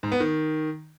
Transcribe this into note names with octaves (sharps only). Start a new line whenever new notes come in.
G#2
B3
D#3